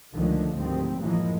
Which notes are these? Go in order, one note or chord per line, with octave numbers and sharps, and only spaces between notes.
C#2 D3 D#3 F3 G#3 A3
D2 G#2 D#3 G3 C4
A1 F#2 E3 F3 G#3 A#3